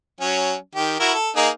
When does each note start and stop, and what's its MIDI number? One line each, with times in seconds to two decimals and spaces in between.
0.21 0.55 54
0.21 0.55 61
0.75 0.97 51
0.75 0.97 67
1.00 1.14 64
1.00 1.14 66
1.00 1.14 70
1.14 1.30 69
1.36 1.49 58
1.36 1.49 63
1.36 1.49 68